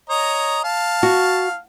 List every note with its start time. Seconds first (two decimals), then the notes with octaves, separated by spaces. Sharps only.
0.10 C#5 D#5 A#5
0.64 F5 A5
1.03 F#4